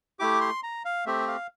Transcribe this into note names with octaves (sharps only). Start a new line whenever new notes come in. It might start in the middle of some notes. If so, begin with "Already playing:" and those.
A3 E4 G4 D6
C6
A#5
F5
A3 C4 G4 E5
F5